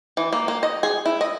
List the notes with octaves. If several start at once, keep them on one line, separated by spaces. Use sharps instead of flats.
E3
A#3
A#3
D#5
G#4
E4
D#5